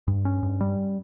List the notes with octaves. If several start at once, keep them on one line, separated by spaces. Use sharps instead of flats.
G2
C#4
G2
G3